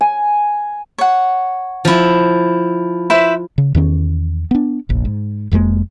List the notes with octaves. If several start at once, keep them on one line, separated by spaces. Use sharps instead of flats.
G#5
C#5 F#5
F3 E4
E4 B4 C5
C#3
E2 D#3 C#4
B3 D4
F1 A#1
G#2
F1 F2 G#3 A#3